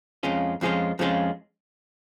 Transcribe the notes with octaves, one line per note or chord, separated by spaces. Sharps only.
F2 F3 G#3 C#4 F4
F2 F3 G#3 C#4 F4
F2 F3 G#3 C#4 F4